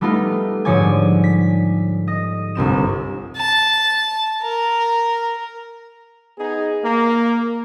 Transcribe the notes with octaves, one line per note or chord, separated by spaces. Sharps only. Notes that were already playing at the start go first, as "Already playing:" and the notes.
G3 A3 B3 D#4 F4
G#2 D3 F3 C#5 D5 G#5
B6
D#5
G1 C2 C4 E7
A5
A#4
B3 D#4 G#4
A#3